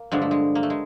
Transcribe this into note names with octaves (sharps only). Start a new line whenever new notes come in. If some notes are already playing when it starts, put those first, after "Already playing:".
Already playing: A#3
G2 D3 F3 G#3
A3
G#3
A#3
A3
G#3